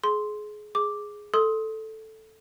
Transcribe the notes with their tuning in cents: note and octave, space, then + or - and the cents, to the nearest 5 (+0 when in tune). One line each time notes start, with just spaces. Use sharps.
G#4 +25 C6 +0
G#4 +0 D6 +0
A4 +0 C6 +10 D#6 +20